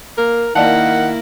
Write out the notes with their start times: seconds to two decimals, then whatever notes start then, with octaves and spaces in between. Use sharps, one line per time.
0.18 A#3 A#4
0.55 D#3 A#3 E4 D5 F5 F#5 A5